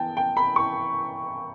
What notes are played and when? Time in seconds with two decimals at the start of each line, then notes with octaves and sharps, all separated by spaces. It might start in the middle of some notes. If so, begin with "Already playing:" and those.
Already playing: E3 B3 G5 A5
0.17 G5
0.37 B5
0.56 C#6